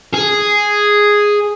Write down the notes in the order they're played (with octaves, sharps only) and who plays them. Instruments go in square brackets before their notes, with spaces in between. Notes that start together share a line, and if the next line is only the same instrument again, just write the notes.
[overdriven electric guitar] G#4